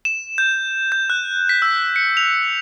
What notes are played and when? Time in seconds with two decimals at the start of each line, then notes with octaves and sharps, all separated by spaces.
0.05 E7
0.38 G6
0.92 G6
1.10 F#6
1.49 B6
1.62 E6
1.96 C#7
2.17 F7